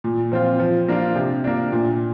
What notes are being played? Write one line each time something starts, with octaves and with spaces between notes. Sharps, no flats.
A#2
F3 C4 F4
F3
A#3 D4 F4
C3
A#3 D4
A#2